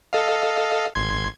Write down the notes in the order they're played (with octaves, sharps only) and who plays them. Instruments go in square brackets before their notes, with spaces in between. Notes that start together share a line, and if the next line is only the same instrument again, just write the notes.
[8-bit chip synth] A4 D#5 F5
G#1 C6 G#6